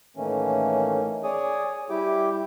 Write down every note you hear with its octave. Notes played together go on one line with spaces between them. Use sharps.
A2 D#3 E3 A3 A#3 C#4
G#4 C#5 D5 G#5 D#6
G3 E4 G4 G5 D6